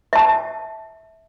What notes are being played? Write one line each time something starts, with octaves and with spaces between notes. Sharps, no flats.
E5 A5